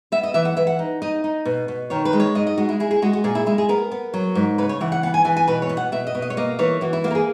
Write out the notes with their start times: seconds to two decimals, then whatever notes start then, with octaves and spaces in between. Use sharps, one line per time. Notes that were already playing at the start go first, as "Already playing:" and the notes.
0.12 B3 E5
0.23 D#5
0.34 E3 E5
0.45 F#5
0.57 E3 E5
0.67 F#5
0.79 D#4
1.02 D#4 D#5
1.24 D#4
1.45 B2
1.68 B2
1.90 D#3 C#5
2.05 B4
2.13 G#3
2.20 C#5
2.35 G#2 D#5
2.47 D#5
2.58 G#3 F#4
2.69 E4
2.80 E4 G#4
2.91 G#4
3.02 G#3 F#4
3.13 F#4
3.24 A#2 G#4
3.35 E4
3.46 G#3 E4
3.58 G#4
3.69 B3 A#4
3.92 B3
4.14 F#3
4.35 G#2
4.58 C#3 B4
4.69 C#5
4.81 E3 F#5
4.92 F#5
5.03 B3 F#5
5.14 G#5
5.25 E3 G#5
5.37 G#5
5.48 B2 B4
5.62 C#5
5.69 B2
5.77 F#5
5.92 B2 E5
6.07 D#5
6.15 B2
6.22 D#5
6.30 C#5
6.37 A#3 D#5
6.59 E3 C#5
6.81 E3 F#4
6.93 E4
7.04 A#3 F#4
7.11 A#4
7.15 G#4